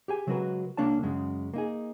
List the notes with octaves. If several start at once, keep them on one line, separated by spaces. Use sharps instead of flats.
G4 G#4 G#5
C#3 F#3 G#3 F#4 A#4 B4
C#2 A#3 D4 C#5 A5
F#2 C#3 G#3
A#3 D#4 G#4